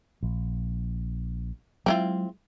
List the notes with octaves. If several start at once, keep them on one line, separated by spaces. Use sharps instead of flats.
A#1
F#3 G#3 C4 E4 F4